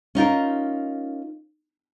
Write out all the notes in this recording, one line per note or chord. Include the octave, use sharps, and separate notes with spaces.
C#4 D#4 F4 A#4